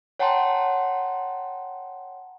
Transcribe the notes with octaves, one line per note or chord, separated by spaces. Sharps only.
C#5 F#5 G5 A5 A#5 C6